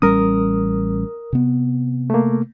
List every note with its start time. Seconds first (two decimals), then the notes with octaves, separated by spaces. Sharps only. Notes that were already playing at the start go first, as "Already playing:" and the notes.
0.02 A1 G3 C#4 A#4 D#6
1.33 C3 B3
2.10 A3 A#3